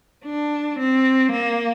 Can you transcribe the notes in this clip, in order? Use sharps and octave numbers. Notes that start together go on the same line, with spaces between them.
D4
C4
A#3